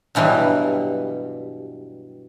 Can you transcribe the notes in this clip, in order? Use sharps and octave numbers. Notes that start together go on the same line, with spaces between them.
G2 B2 E3 F#3 G3